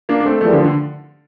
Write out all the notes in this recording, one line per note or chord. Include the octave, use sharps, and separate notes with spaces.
A#3 D4
D4
A3 C4
E2 E3 F3 G3 A3 A#3
D3 F3
D3